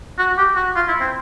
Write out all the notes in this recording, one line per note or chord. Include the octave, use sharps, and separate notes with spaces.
F#4
G4
F#4
F4
E4
C4